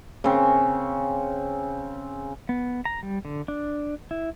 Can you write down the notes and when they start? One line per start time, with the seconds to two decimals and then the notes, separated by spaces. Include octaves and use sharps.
0.24 C#3 C4
2.49 B3
2.85 A#5
3.03 G3
3.25 D3
3.48 D4
4.11 E4